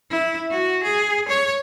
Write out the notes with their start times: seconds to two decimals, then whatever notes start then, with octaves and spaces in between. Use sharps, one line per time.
0.11 E4
0.51 F#4
0.83 G#4
1.28 C#5